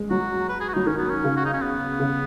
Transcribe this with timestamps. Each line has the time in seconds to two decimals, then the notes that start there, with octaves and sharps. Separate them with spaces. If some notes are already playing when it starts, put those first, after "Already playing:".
Already playing: G#3
0.10 F#3 F#4
0.49 B4
0.61 G#4
0.69 F#4
0.74 F#3 D#4
0.86 D#3 C#4
0.98 B3
1.10 C#4
1.24 C#3
1.37 F#4
1.45 D#4
1.54 C#4
1.62 B3
2.00 C#3